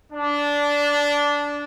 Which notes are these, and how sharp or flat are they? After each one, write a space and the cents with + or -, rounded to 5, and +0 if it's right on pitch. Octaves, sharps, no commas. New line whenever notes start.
D4 -15